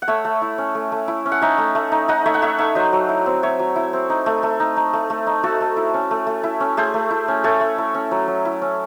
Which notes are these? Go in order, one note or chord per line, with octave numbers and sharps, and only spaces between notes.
F#5
A3 C#5 E5
A3
E4
C#4
A3
A3
E4
C#4
F#5
D#4 C#5 E5
A3
A3
D#4
D#4 D#5 F#5
A3 C#5 E5
F#5
A3 C#5 E5
D#4 C#5 E5
F#3 C5 D#5
F#3
E4
C4
F#3 C#5 E5
F#3
E4
C4
D#4
A3
A3
D#4
D#4
A3
A3
D#4
A3 F#4 A4
A3
E4
C#4
A3
A3
E4
C#4
A3 G#4 C5
A3
E4
C#4
A3 A4 C#5
A3
E4
C#4
F#3
F#3
E4
C#4